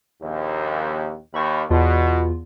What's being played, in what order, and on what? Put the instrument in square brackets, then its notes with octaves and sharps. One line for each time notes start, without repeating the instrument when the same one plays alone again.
[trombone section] A#1 D#2
[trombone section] D#2 [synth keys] B5 C#6
[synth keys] E2 F4 [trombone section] B2